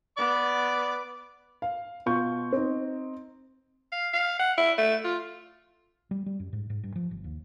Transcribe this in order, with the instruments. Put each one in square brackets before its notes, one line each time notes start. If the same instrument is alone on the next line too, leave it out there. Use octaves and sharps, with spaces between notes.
[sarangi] B3 [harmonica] D5 D6
[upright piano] F5
B2 F4 C#6 G6
C4 D#4
[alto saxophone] F5
F5
F#5
E4
A3
F4
[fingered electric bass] G3
G3
F#2
G#2
G#2
G2
F3
G1
D#2